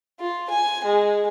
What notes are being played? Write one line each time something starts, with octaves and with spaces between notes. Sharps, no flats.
F4
G#5
G#3